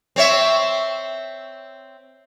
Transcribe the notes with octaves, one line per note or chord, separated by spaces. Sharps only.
C4 C#5 E5